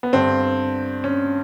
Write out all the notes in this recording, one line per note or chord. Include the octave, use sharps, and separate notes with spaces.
B3
G2 D3 C4
C#4